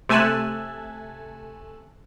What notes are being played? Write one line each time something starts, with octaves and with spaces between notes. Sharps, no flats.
C3 A3 G#5 A5 E6 F#6